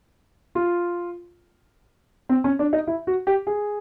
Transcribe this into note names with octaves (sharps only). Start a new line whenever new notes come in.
F4
C4
C#4
D4
D#4
E4
F#4
G4
G#4